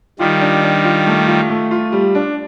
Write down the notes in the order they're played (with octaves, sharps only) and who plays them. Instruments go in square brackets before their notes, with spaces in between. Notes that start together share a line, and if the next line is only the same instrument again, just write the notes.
[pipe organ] D#3 G3 [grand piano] F4
[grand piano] D4
D4
F4
A3
F4
A3
F4
G3
D4